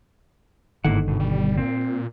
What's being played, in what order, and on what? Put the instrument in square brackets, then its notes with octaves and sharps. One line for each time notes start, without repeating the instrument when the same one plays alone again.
[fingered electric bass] G1 D3 D#3 [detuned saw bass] G#2 [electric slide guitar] A#3 E4 F#5
[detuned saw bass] G#1 [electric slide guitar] B2
[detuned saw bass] G3
[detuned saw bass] A#2 [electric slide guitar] C4